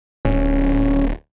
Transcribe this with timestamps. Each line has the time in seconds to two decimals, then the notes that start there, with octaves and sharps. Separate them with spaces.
0.25 D1 C#4